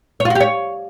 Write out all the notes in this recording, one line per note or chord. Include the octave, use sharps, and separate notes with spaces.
C#5
F4
F#4
G4
C#5